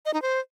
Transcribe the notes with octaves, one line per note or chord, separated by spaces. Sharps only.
D#5
D#4
C5